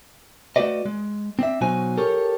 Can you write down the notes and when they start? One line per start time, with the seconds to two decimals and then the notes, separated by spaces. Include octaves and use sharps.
0.56 A3 F#4 G4 B4 D5 D#5
0.86 G#3
1.39 C4 D4 E5
1.61 B2 F#3 D#4 F#4 C5 G#5
1.98 G4 A4 A#4 C#5